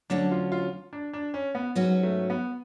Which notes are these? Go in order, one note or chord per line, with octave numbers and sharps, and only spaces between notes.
D2 D3 F#3 C#4 D4
F4
F4
D4
D4
C#4
B3
G#2 F#3 C#4 F#4 B4
A3
B3